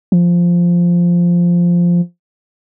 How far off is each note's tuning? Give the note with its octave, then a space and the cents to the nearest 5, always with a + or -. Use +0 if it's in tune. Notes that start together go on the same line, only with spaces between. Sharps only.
F3 -5